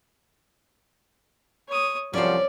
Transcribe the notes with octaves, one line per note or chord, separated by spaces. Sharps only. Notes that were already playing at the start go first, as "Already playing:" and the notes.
C#5 D#6
C2 F3 F#3 C#4 C5 D5